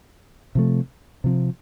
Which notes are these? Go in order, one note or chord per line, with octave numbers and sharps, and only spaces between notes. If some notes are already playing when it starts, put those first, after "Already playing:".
C3 F3 A3
C3 F3 C4